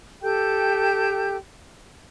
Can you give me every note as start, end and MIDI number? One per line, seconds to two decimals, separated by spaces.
0.22 1.37 67
0.22 1.37 69
0.22 1.37 79
0.22 1.37 91